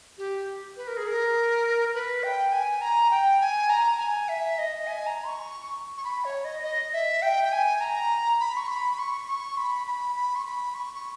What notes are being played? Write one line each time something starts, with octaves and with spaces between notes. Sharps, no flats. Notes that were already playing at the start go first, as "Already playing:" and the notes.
G4
B4
A#4
G#4
A#4
B4
G5
G#5
A#5
G5
G#5
A#5
G#5
E5
D#5
G#5
A#5
C#6
C#6
B5
C#5
D#5
D#5
E5
G5
G5
G#5
A#5
B5
C#6
B5
B5
C#6
C#6
B5
B5
B5
C#6
B5
C#6
C#6